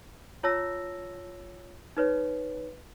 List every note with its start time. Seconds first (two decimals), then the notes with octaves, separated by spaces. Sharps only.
0.43 F4 C#5 A5 E6 A#6
1.97 D#4 B4 C#5